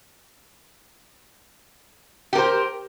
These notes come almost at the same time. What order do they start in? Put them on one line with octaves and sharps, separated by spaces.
G4 A#4 C5